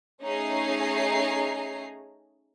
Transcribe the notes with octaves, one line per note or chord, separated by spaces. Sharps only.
A3 C#4 D#4 G#4 A#5 C7